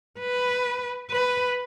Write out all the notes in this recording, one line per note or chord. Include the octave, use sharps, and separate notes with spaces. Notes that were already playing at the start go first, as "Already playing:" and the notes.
B4
B4